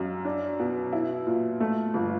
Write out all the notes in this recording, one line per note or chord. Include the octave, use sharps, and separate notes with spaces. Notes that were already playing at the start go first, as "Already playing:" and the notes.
Already playing: F#2
D4
B2
E4
A#2
A3
G1